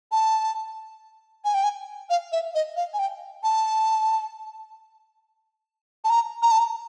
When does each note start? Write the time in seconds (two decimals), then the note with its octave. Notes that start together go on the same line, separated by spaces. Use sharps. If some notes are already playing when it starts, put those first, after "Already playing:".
0.12 A5
1.45 G#5
1.54 G5
1.64 G#5
2.10 F5
2.32 E5
2.55 D#5
2.76 F5
2.94 G#5
2.99 G5
3.43 A5
6.04 A5
6.10 A#5
6.42 A#5
6.51 A5
6.59 A#5